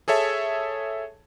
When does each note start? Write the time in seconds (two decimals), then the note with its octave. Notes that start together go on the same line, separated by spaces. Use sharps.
0.08 G#4 A4 C#5 E5 A5